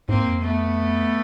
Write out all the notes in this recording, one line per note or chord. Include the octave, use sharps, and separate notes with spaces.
G#2 A#3 C4
F2
A3 B3